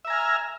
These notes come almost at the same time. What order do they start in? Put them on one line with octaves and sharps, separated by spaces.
E5 A#5 G#5 F6